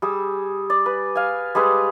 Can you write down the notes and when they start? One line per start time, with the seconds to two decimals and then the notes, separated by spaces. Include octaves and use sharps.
0.02 G3 G#4 E6
0.70 D5
0.86 B4
1.15 F5 G#5
1.55 G3 G#3 G#4 B4